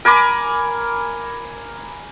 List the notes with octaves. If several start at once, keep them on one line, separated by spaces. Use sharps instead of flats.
A#4 G#5 B5 D6